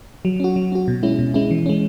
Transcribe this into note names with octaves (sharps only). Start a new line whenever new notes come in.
F#3
C#4 F#4
F#3
C#4 F#4
B2
G#3 C#4 E4
B2
G#3 C#4 E4
E3
G#3 C#4